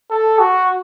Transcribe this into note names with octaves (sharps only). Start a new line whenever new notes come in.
A4
F#4